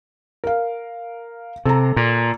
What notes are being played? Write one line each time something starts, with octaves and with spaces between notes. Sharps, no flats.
A#4 F5
C3 A4 A#5
A#2